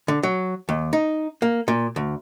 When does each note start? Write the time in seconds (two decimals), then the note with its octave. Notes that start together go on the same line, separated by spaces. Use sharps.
0.08 D3
0.23 F#3
0.69 D#2
0.93 D#4
1.42 A#3
1.68 A#2
1.96 D2